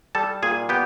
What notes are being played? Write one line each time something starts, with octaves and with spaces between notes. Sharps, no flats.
G3 A4 A5
A#2 G#4 G#5
B3 G4 G5